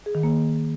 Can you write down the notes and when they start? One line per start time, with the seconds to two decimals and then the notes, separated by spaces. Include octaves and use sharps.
0.06 G#4
0.15 D#3
0.23 A#3